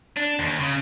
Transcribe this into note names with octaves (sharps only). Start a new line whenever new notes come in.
D4
D#2
C#3